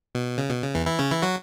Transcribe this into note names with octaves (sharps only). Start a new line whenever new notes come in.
B2
C#3
B2
C#3
E2 E3
E3 E4
C#3 C#4
E3 E4
F#3 F#4